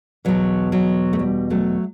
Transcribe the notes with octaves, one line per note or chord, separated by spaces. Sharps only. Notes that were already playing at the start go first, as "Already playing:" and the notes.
E2 B2 F#3
F#3
A3
G3
F#3 A3